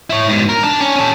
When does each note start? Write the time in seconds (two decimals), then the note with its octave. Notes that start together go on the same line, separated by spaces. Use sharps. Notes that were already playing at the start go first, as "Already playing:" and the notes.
0.10 E4 C#5
0.27 G#2 B2
0.49 A#4
0.63 D4
0.80 C#4
0.96 C#4 A4